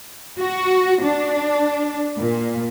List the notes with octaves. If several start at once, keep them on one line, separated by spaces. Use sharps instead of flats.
F#4
D4
A#2